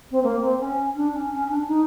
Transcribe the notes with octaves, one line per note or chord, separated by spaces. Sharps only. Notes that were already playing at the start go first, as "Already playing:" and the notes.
C4
A#3
C4
C#4
D4
C#4
C#4
D4
D#4